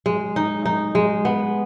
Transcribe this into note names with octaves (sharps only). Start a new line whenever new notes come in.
G#3
D#4
D#4
G#3
B3